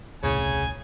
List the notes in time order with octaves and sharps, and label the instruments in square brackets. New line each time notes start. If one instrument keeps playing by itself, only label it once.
[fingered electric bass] D#1 C2 A2 [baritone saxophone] C#3 [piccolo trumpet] G#5